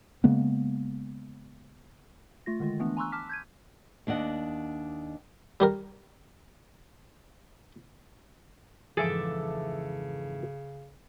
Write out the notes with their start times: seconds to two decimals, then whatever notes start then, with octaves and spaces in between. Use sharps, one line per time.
0.24 C#3 G#3 A#3 B3
2.46 A3 F4 A#6
2.60 D3 D#3 G#3 F4
2.79 E3 A3 B3 D4
2.97 G#5 A#5 C6 C#6 E6 F#6
3.12 A5 D6 F6 B6
3.29 G6 G#6 D#7
4.07 D#2 D4 D#5 F#5
5.60 G3 G4 A#4
8.97 F2 G#2 C#3 E3 G#4 A4 E5 D6